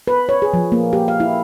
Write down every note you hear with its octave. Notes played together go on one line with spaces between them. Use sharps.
B4
C#5
G#4
F3
A#3
G4
F5
E4